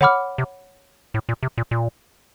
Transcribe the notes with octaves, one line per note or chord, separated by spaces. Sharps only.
D3 C#5 F#5 B5 D6 F6
C3
A2
A#2
C3
A#2
A#2